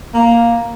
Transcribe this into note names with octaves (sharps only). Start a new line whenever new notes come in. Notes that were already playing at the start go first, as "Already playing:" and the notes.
A#3